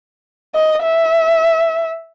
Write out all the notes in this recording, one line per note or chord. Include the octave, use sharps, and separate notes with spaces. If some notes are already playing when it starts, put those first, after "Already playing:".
D#5
E5